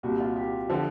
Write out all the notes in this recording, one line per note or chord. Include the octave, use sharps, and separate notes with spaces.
C2 A#2 G3 F#4
F4
G4
D3 F3